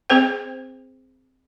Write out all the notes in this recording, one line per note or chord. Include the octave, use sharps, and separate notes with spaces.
C4 G#4 C5 G5